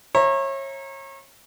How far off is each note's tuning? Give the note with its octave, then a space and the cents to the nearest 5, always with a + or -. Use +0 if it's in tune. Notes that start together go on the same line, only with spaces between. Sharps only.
C#5 -30 E5 +0 A#5 +0